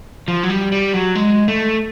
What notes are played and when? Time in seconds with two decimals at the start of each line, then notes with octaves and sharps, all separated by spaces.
0.28 F3
0.43 F#3
0.50 G3
0.72 G3
0.94 F#3
1.15 G#3
1.48 A3